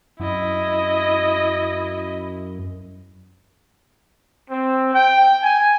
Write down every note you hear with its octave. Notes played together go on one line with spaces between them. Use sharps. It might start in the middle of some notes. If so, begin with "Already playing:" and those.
F#2 E4 D#5
C4
G5
G#5